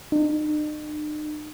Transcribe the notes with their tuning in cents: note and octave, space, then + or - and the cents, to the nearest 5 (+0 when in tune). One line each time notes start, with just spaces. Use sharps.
D#4 -45